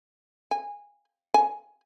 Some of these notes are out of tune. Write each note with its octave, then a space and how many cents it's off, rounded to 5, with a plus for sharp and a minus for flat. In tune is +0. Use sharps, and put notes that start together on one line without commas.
G#5 -15
G#5 +5